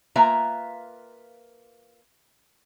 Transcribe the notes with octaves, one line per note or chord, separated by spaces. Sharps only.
A#3 F4 B4 E5 G#5 A#5